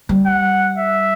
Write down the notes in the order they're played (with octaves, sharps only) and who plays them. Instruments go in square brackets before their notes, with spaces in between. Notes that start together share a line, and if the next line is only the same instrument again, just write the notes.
[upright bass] G3
[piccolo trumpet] F#5
E5